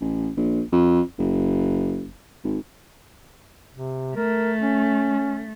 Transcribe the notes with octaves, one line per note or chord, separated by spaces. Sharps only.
A1
A#1
F2
F#1
G#1
C3
A3 A#4
C#4